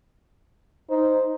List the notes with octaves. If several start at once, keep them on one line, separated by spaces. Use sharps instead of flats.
D#4 C5